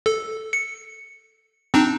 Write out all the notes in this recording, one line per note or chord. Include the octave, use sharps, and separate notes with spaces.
A4
C#7
C4 D4 D#4